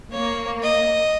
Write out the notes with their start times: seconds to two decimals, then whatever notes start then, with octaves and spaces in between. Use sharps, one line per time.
0.12 A#3 C#5
0.63 D#5